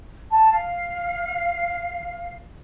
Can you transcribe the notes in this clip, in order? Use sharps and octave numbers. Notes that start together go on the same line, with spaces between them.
A5
F5